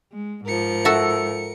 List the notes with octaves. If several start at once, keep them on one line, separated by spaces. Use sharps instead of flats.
G#3
G#2 F3 A#4 C#7
F#4 A4 E5